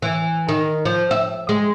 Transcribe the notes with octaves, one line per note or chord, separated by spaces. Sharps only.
E3
D#3
F3
E5
G#3